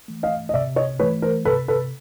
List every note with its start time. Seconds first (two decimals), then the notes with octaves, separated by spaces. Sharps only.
0.08 E3 A3
0.23 D#5 F5
0.49 D#5
0.54 C3 D5 E5
0.76 C#5 D#5
1.00 E3 A3 B4 C#5
1.22 A#4 C5
1.45 C3 A4 B4
1.68 A4 B4